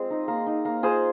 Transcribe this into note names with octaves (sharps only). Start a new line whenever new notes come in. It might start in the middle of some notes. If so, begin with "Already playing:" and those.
Already playing: G#3 C4 F4 G#4
D#4
A#3
D#4
A#3
F4 G#4 C5